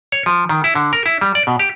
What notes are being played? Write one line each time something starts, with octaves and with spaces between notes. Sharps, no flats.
C#5
F3
D#3
E4
D3
A#4
E4
G3
D5
B2
G4